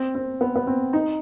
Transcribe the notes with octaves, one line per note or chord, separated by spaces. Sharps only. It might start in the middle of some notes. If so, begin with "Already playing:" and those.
Already playing: C4
C4
B3
B3
C4
D#4